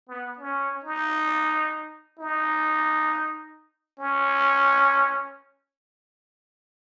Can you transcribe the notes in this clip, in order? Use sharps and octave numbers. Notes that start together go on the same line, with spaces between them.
B3
C#4
D#4
D#4
C#4